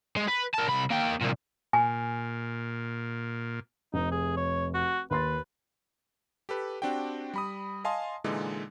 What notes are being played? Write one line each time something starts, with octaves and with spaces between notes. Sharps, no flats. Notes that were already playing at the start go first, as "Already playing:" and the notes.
G#3
B4
A#4 A5
C2 B5
A#3 G5
C2 A#2
A#2 G#5
F1 D#4
G#4
C#5
F#4
D#2 B4 C6 A6
G4 A4 B4
C4 D4 F#4 G4 G5
G3 B5 D#6
D#5 F5 G#5 A5 C6 D#6
A#2 D3 E3 G#3 D#4